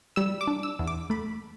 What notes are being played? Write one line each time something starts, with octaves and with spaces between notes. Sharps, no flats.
G3 E6
D6
D4
E6
E2
D6
A3 B5